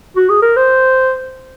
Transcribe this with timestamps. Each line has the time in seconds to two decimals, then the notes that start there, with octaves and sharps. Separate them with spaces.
0.17 F#4
0.30 G#4
0.42 A#4
0.57 C5